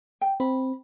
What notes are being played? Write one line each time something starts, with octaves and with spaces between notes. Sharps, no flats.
G5
C4 B5